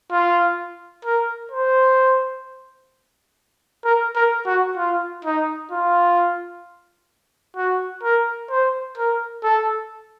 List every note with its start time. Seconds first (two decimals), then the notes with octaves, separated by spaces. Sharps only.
0.12 F4
1.05 A#4
1.52 C5
3.85 A#4
4.15 A#4
4.46 F#4
4.77 F4
5.25 D#4
5.71 F4
7.57 F#4
8.03 A#4
8.50 C5
8.98 A#4
9.44 A4